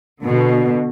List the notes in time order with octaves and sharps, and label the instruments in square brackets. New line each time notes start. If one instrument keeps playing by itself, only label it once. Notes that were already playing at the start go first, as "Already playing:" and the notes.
[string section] B2 D3